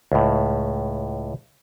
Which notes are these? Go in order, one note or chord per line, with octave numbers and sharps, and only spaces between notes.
C#2 A2